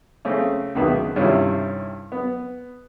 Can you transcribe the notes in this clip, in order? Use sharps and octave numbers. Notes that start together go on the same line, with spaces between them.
C#3 A3 C4
C#2 B2 D#3 B4 E5
G2 C3 D#3 C#4 E4 F4
B3